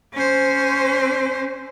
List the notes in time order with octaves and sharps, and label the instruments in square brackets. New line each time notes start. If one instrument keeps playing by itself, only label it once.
[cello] C#4 C5